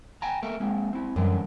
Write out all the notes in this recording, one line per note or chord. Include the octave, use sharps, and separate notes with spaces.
G5 G#5 A#5
A3 A#3 A#4
G#3 A#3 C4
C4 E4
F#2 D3 E3 G3